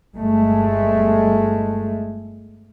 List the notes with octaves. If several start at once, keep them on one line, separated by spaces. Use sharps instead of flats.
G1 G#3 A3